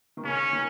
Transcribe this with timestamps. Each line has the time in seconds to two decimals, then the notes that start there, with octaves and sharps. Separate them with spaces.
0.17 D#3
0.24 C#3 C#4
0.53 D#3